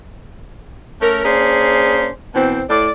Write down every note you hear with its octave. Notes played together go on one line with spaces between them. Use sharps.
A3 C#4 A#4
A#3 C#4 D4 G#4 C5
B2 E3 C4
A2 D5